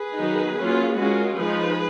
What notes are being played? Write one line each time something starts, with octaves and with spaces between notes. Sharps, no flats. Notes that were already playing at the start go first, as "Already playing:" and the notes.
Already playing: G#4 B4
D#3 F#3 B3 D#4
F#3 A#3 C#4 F4
G#3 C#4 F4 F#4 A#4
F3 G#3 D#4 G#4 B4